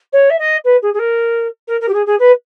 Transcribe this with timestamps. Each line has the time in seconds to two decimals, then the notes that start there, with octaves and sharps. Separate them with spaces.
0.13 C#5
0.30 E5
0.39 D#5
0.64 B4
0.82 G#4
0.94 G#4
0.99 A#4
1.68 A#4
1.81 A#4
1.88 G4
1.94 G#4
2.06 G#4
2.19 B4